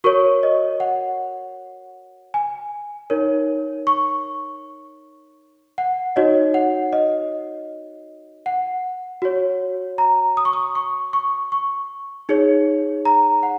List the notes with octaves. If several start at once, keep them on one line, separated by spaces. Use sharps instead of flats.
F#4 A#4 C#5 C#6
D#5
F#5
G#5
D#4 A#4 C#5
C#6
F#5
D#4 F#4 C#5 D#5
F#5
D#5
F#5
F#4 C#5
A#5
D#6
C#6
D#6
C#6
C#6
C#6
D#4 G#4 C#5
A#5
F#5